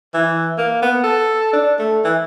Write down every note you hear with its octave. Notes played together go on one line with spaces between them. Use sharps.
E3
A#3
B3
A4
D4
A3
E3